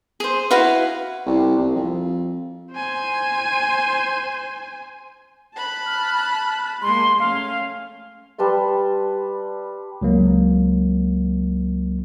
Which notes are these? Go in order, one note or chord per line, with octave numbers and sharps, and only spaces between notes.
G#4 C5
E4 F#4 B4 F5
C2
C2
F2
C5 G#5
A5 B5 F#6
F6
G#3 A#3 C6
A3 C#4 F5
G3 B4 A5 C6
C#2 F#3 A#3